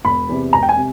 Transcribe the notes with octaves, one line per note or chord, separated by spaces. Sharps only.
E1 B5
E2 C3
E1 A#5
G5
G#5
C3